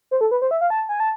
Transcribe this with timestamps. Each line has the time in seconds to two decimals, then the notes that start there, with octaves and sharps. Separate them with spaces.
0.11 C5
0.21 A4
0.31 B4
0.42 C5
0.51 E5
0.61 F5
0.70 A5
0.89 G#5
1.00 A5